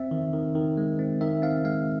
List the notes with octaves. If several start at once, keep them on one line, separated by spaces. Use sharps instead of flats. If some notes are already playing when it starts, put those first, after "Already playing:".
Already playing: C4 E5
D#3
D#3
D#3
G#3
C4
D#3 E5
C4 F5
G#3 F5